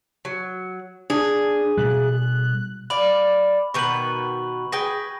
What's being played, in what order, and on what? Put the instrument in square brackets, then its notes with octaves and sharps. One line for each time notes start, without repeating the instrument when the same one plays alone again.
[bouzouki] F#3
[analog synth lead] D4 [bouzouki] G#4
[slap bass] B2 G3 [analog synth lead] F#6
[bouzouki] D5 F5 [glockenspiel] B5
[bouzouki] B2 D#3 B4 [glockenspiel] C#6 F#7
[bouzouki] G#4 B4 G5 [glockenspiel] A#6